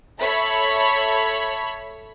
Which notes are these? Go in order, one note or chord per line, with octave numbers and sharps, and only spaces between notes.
A4 C#5 E5 B5